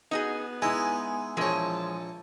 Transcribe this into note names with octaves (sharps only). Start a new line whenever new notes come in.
B3 D#4 F#4 G#4
G#3 D#4 E4 G#5
A#1 E3 F3 G#3 C#5 A5